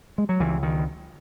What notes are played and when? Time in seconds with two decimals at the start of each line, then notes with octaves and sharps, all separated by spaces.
0.18 G#3
0.29 F#3
0.40 C#2 E3
0.63 D#3